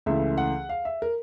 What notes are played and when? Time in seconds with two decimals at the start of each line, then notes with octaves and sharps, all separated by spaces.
0.06 C#2 C#3 E3 A3 E5
0.38 F#5
0.69 F5
0.85 E5
1.02 A#4